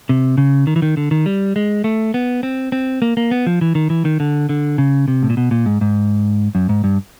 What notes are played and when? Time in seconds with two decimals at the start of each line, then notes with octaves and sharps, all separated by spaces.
0.09 C3
0.38 C#3
0.67 D#3
0.76 E3
0.82 D#3
0.97 D3
1.11 D#3
1.26 G3
1.56 G#3
1.84 A3
2.14 B3
2.43 C4
2.72 C4
3.02 A#3
3.17 A#3
3.31 B3
3.47 F3
3.61 E3
3.75 D#3
3.90 E3
4.05 D#3
4.20 D3
4.49 D3
4.78 C#3
5.08 C3
5.23 A2
5.30 A#2
5.37 B2
5.51 A#2
5.66 G#2
5.81 G#2
6.55 F#2
6.69 G#2
6.84 G2